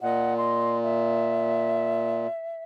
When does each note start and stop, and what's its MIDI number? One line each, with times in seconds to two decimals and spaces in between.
0.01 2.27 46
0.01 0.36 75
0.01 0.36 78
0.36 0.77 75
0.36 0.77 84
0.82 2.62 76